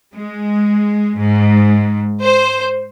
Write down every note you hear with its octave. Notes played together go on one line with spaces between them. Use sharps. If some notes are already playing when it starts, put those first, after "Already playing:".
G#3
G#2
C5